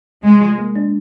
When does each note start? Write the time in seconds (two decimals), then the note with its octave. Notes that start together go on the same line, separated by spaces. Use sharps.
0.23 C3 G#3
0.41 F3
0.58 A#3
0.75 D4